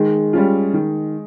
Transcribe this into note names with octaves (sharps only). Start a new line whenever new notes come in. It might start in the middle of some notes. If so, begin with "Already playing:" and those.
Already playing: D#3 G#3
G3 C#4 F4
D#3